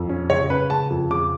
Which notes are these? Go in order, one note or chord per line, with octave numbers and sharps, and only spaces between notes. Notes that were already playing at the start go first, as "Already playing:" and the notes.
Already playing: F2
C#4
C#3 C#5
C#4 B4
C#3 A5
F2
C#3 D6